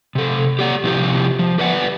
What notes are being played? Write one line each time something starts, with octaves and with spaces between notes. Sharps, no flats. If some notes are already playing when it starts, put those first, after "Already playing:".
C3 A4
G4 D5 F#5
C3 F3 E4 F4 G4
F3
G4 B4 D5 F#5